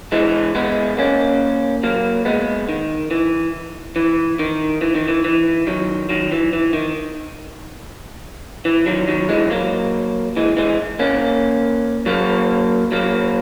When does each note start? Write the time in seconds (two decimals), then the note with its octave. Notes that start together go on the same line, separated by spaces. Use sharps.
0.12 E3 G#3
0.55 G#3 B3
0.98 A#3 C#4
1.83 F#3 A#3
2.25 G#3 B3
2.69 D#3
3.11 E3
3.96 E3
4.39 D#3
4.81 E3
4.95 D#3
5.08 E3
5.25 E3
5.67 D#3 F#3
6.09 D#3 F#3
6.32 E3
6.53 E3
6.73 D#3
8.65 E3
8.86 D#3 F#3
9.08 D#3 F#3
9.29 E3 G#3
9.51 F#3 A#3
10.37 E3 G#3
10.57 E3 G#3
10.99 A#3 C#4
12.06 F#3 A#3
12.92 F#3 A#3